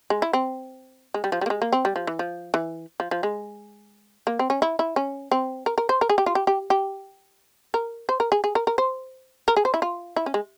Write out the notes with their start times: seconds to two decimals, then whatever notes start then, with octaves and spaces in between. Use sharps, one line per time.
0.10 G#3
0.22 E4
0.33 C4
1.14 G#3
1.24 G3
1.32 F3
1.41 G3
1.46 A#3
1.50 G#3
1.62 A#3
1.73 C4
1.85 G3
1.96 F3
2.07 E3
2.19 F3
2.54 E3
3.00 F3
3.11 F3
3.23 G#3
4.27 A#3
4.39 C4
4.50 C#4
4.62 E4
4.79 E4
4.96 C#4
5.32 C4
5.66 A#4
5.78 A#4
5.89 C5
6.01 A#4
6.10 G#4
6.18 G4
6.26 F4
6.35 G4
6.47 G4
6.70 G4
7.74 A#4
8.09 C5
8.20 A#4
8.32 G#4
8.44 G#4
8.55 A#4
8.67 A#4
8.78 C5
9.48 A#4
9.57 G#4
9.65 C5
9.74 E4
9.82 F4
10.16 E4
10.26 C#4
10.34 G#3